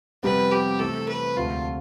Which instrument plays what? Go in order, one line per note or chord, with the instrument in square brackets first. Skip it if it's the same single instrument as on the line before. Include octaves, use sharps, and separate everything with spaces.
[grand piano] F2 C3 G3 B3 [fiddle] B4
[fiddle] G4
[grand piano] C3 E3 A3 [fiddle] A4
[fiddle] B4
[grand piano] E1 D2 C3 F3 A3 [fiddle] F4